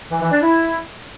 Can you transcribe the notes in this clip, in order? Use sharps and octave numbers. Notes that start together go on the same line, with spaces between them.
E3
E3
D4
E4